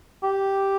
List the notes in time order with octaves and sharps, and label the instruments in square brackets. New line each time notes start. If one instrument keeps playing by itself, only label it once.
[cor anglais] G4